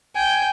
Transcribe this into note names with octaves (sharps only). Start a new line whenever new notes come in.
G5 G#5